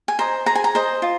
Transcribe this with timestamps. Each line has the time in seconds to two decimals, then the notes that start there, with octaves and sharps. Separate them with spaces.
0.08 G#5
0.19 C5 D#5 A#5
0.46 G#4 A#5
0.55 G#5
0.64 A#5
0.75 C5 D#5
1.02 F4